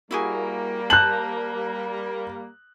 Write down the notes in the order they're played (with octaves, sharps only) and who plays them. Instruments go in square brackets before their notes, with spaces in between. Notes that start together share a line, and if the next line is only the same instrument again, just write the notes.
[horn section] G3 A#3 [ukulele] E4 F#4 G#4
[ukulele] C5 A5 [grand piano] F#6 F#7